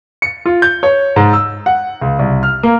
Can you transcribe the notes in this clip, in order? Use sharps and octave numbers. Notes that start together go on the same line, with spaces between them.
C#7
F4
G6
C#5
G#2
E6
F#5
C#2
C2
F6
A#3